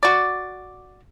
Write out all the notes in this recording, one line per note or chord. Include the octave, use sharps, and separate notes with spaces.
F#4 D5